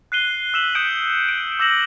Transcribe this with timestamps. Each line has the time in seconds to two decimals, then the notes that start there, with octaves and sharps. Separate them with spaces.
0.12 F#6 C7 D#7 G7
0.54 E6 B6 E7 F#7
0.75 D#6 G6 B6 C#7 D7
1.29 D7
1.59 D6 E6 G6 A#6 E7 F#7